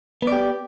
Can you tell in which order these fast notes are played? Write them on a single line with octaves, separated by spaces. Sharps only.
B3 D5 G4